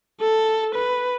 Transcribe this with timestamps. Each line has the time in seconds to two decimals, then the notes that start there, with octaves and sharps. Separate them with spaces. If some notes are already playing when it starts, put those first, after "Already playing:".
0.21 A4
0.75 B4